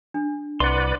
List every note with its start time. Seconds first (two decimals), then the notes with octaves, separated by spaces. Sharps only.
0.14 D4
0.60 C2 B4 D5 F#5 C6